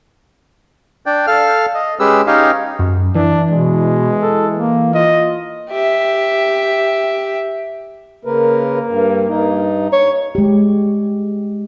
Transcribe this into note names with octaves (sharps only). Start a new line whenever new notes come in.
D4 D5 G5
A4 F5 F6
D#5
G#3 C#4 G4 G#4 B4 E6
C#4 D#4 G4 C#5 D#5 F5
F#2
E3 D4
B2 G#3
A4
A#3
F4 D#5
G4 E5
C#3 A#3 A#4 B4
G2
G2 D#4
C#5
G#3 G4